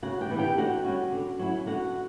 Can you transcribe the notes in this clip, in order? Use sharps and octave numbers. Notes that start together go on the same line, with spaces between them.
C#3 F#4 F#5
G4 G5
E3 B3
G4 G5
D3 F#4 F#5
G3 C#4
D3
F#3 C#4 E4
D3 F#4 F#5